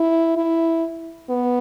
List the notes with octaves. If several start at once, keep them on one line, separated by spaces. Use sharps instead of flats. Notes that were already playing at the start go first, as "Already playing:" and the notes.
Already playing: E4
E4
B3